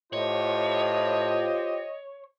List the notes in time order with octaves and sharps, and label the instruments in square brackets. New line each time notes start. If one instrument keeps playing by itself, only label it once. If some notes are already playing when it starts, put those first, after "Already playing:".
[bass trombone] A2 [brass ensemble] F4 G4 C5 [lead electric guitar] C#5 [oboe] D#5